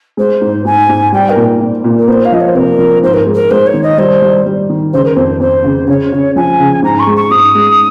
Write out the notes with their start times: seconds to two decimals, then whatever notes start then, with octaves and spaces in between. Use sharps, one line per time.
0.17 G#3 C5
0.41 G#2
0.65 G#2 G#5
0.89 G#2
1.12 G3 G5
1.29 A#4
1.36 A#2
1.60 A#2
1.84 A#2
1.98 A#4
2.08 A#3 C5
2.24 F5
2.32 F3 D#5
2.40 C#5
2.48 C5
2.55 C3 A#4
2.79 F3
3.03 G#2 C5
3.13 A#4
3.26 G#3
3.33 A#4
3.50 G#3 C5
3.66 C#5
3.74 D#3
3.82 D#5
3.98 G3 C5
4.22 G3
4.46 G3
4.69 D#3
4.93 C#3 C5
5.04 A#4
5.15 F2 C5
5.40 F2 C5
5.64 C#3
5.88 C#3 C#5
6.12 C#3
6.36 F3 G#5
6.60 C#3
6.82 G#2 A#5
6.99 C#6
7.07 G#3
7.15 C#6
7.30 G#2 D#6
7.55 G#3